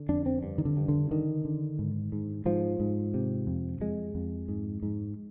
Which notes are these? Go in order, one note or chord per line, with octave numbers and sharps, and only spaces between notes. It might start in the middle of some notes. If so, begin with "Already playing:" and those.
Already playing: D3
F2 D4
C4
G2
D#3
D3
G2
D3
D3 D#3
D3
G#2
G#2
G#2 F3
G#2
C3
F2
F2 G#3
F2
G#2
G#2